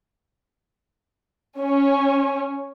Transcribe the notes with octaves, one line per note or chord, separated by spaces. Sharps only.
C#4